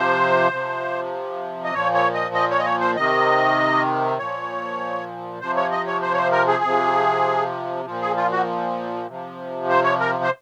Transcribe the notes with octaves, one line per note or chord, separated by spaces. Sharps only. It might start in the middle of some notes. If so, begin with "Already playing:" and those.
Already playing: C3 F3 C5
C3 F3
D#5
A#2 F3 C#5
C#5
D#5
D#5
C#5
D#5
C#5
C5
C3 D#3 D#5
A#2 F3 C#5
C3 F3 C5
C#5
D#5
C#5
C5
C#5
C5
A#4
G#4
C3 F3
A#2 F3
G#4
F4
F#4
C3 F3
C5
C#5
A#4
C5